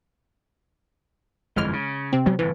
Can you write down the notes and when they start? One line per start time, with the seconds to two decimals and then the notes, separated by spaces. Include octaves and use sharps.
1.56 G1 F2 E3 G#3 F6
1.73 C#3
2.13 C3 C4
2.26 F#3 G#3 B3
2.39 G1 A2 E3